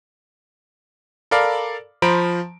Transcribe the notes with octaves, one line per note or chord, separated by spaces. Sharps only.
A4 A#4 D5 F5 B5
F3 C5 A#5 B5 D7